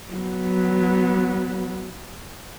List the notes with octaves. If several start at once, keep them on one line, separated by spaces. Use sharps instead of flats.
F#3 B3